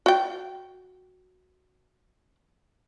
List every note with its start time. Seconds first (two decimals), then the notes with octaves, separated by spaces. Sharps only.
0.06 F#4 G5